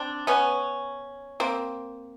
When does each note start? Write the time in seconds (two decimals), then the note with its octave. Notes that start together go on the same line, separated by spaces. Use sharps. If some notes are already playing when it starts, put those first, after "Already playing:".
Already playing: C4 D4
0.27 B3 C#4
1.40 A#3 C4